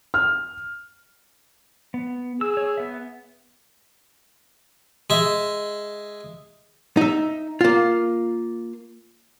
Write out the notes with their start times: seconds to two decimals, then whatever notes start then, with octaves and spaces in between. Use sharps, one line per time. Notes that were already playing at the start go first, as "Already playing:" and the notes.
0.14 F6
1.94 B3
2.41 G#4 E6
2.54 C#5 E6
2.78 B3 E5
5.10 G#3 E5
6.97 D#4 E5
7.61 A#3 F4